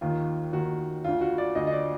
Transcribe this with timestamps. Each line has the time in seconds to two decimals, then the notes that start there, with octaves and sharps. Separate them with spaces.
0.01 D#2 D#3 F4
0.53 D#2 D#3 F#4
1.04 D2 D3 F4
1.21 F#4
1.38 D5
1.55 D2 D3 D#5
1.67 D#5
1.72 D5